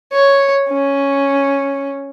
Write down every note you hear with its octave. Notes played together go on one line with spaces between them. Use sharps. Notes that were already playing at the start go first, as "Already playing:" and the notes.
C#5
C#4